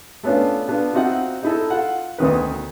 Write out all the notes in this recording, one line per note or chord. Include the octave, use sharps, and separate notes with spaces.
A3 B3 C#4 D4 F4
B3 D4 F4
C4 D#4 F4 F#4 E5 F#5
D#4 E4 A4
F4 F#5
D2 B2 D#3 B4